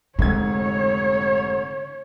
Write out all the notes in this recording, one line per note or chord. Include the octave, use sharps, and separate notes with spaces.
F1 G#2 D3 C#5 G#6